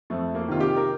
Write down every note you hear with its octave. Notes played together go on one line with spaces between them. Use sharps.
F2 A3
A#3
C3 D#3 F4
G4
A#4